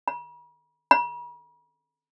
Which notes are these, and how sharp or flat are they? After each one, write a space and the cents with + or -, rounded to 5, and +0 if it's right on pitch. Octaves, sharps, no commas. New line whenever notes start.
B5 -45
B5 -45